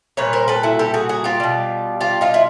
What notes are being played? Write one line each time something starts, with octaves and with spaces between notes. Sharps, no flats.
A#2 G3 B4 C#5
A#4 C5
A4 B4
E4 F#4
G4 A4
F#4 G#4
F#4 G#4
F4 G4
B2 G3
F4 G4
D#4 F4
E4